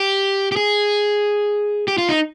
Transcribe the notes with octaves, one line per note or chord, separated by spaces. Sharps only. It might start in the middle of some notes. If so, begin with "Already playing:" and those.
Already playing: G4
G4
G#4
G4
F4
D#4